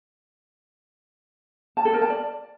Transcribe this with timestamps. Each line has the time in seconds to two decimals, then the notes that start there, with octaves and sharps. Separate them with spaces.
1.77 A5
1.85 A4
1.93 A#4
2.01 A5
2.10 D5